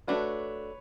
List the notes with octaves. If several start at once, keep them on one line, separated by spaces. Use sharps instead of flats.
A3 D4 F#4 B4 C#5